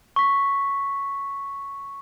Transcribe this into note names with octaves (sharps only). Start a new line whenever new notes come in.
C#6 B6